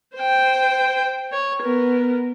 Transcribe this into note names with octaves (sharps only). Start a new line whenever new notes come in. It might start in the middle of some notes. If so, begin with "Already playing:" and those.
C5 G5
C#5
B3 A#4